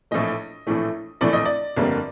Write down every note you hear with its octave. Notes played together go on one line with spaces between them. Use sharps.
A#1 A2 E3 A3 D#5
A#1 A2 E3 A3
A#1 A2 E3 A3 D5
D#5
D5
G1 F2 D3 G3 A#3